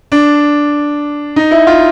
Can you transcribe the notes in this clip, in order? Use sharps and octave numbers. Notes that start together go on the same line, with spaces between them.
D4
D#4
E4
F4